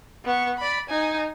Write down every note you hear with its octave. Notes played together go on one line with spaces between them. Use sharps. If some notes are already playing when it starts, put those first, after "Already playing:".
B3 C#6
D5 B5
D#4 G#5